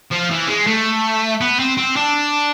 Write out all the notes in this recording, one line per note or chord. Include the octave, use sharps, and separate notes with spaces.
F3
E3
G#3
A3
B3
C4
C4
D4